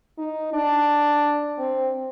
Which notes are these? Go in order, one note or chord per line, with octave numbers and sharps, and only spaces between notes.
D#4
D4
C4